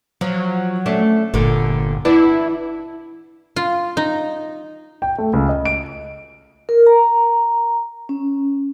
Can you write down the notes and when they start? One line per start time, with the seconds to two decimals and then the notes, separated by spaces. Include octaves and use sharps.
0.21 F3 F#3
0.86 A3 C#4 D4
1.34 G1 A#2 D3
2.05 E3 B3 D4 E4
3.56 F4
3.97 D#4
5.02 G5
5.18 A3
5.33 C#2
5.49 D#5
5.65 D7
6.69 A#4
6.87 A#5
8.09 C#4